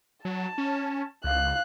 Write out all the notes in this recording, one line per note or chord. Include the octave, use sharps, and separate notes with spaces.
F#3 A5
C#4
C#2 F5 F#6